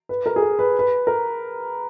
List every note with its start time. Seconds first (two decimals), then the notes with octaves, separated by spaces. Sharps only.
0.09 B4
0.26 A#4
0.36 G#4
0.42 A#4
0.59 B4
0.79 B4
1.07 A#4